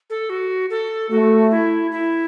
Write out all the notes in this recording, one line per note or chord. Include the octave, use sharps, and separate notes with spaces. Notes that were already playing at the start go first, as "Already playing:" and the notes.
A4
F#4
A4
A3 F#4
E4
E4